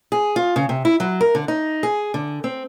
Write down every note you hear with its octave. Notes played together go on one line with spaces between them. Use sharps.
G#4
F4
C#3
C3
E4
F#3
A#4
D3
D#4
G#4
D3
C4